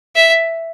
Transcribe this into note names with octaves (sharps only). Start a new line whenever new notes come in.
E5